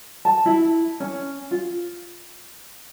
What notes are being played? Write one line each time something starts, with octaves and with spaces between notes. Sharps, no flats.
A5
E4
C#4
F4